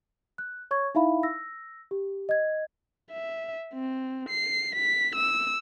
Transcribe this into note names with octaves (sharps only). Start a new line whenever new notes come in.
F#6
C#5 C#6 G#6
D#4 E4 E5 F5 B5
E6 A#6
G4
D#5 G#6
E5
C4
C7
B6
E6